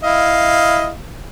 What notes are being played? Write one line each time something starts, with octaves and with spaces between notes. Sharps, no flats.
E4 D#5 F5